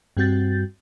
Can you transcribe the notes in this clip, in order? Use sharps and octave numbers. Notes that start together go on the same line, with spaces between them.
G2 G3 C4 F#4 G6 A6